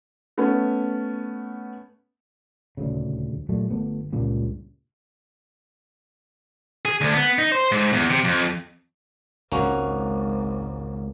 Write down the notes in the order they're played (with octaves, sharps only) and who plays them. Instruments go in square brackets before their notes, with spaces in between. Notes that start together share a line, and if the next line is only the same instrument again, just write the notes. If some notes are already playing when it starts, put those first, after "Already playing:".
[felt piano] A3 B3 C#4
[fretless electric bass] D#1 D2 C#3
A#2 F#3 G3 A3
G1 A3 B3
C#2 G2 A#2 C#3
[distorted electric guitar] G#4
D2
B3
D#4
C5
G#2
E2
C3
F2
[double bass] G#1 [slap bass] C#2 [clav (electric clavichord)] A#3 C#4 F#4